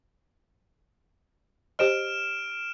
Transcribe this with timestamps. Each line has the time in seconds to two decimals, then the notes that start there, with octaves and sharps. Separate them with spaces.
1.79 G4 C5 D#5 F6 D7 E7